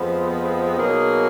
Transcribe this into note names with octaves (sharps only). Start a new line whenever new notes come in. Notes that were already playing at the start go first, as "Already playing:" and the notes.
Already playing: F2 F3 G#3 B3
B2 F#3 A#3 D#4 G#4